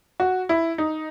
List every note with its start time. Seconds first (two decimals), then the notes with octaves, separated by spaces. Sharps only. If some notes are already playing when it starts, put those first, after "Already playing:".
0.20 F#4
0.49 E4
0.78 D#4